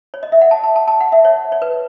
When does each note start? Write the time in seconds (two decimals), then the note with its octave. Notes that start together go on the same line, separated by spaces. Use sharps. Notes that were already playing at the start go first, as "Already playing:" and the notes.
0.14 C#5
0.23 D#5
0.32 E5
0.41 F#5
0.51 A5
0.63 A5
0.76 A5
0.88 A5
1.01 F#5
1.12 E5
1.25 C#5
1.52 C#5
1.62 B4